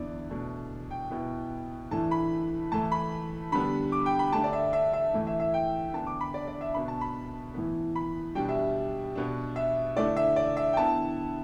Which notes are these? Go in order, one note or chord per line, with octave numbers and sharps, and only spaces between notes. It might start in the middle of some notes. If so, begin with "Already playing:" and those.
Already playing: E2 D3 B3 E4 D5
B2 A3 D4
G5
B2 B3 E4
A2 E3 A3 D4 A5
B5
A2 E3 A3 A5
B5
D3 G3 B3 D4 B5
D6
G5
B5
D3 A3 D4 A5
D5
E5
E5
E5
A2 E3 A3 E4
E5
E5
G5
D3 B3 D4 A5
D6
B5
D5
D5
E5
B2 B3 D4 B5
A5
B5
A2 E3 B3
B5
B2 G3 D4 G5
E5
B2 B3 D4
E5
D3 A3 E4 D5
E5
D5
E5
G5
D3 B3 E4 A5